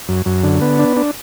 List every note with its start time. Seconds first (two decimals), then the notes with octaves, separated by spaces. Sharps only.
0.09 F#2
0.26 F#2
0.44 D3
0.61 B3
0.79 D4
0.97 D4